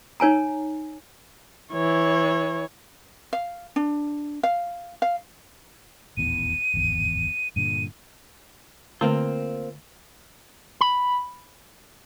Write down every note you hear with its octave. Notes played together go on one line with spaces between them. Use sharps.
D#4 C#5 G#5 A#5
E3 C#5
F5
D4
F5
F5
D#1 A1 E2 D#7
D1 G#1 E2
G2 A#2 D3 D#7
D3 A3 A#3 C4 F4 B4
B5